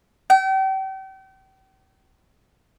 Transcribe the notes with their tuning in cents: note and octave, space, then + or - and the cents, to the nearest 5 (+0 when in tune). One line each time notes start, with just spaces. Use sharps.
G5 -40